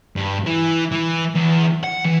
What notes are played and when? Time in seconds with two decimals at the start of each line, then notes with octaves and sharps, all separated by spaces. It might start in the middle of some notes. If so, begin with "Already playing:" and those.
0.16 G2
0.46 E3
0.92 E3
1.35 E2
1.83 F#5
2.04 E3